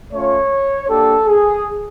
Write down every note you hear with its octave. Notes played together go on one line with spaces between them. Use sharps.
A3 C#4 F4 C#5
A#3 D4 G4 A4
G#4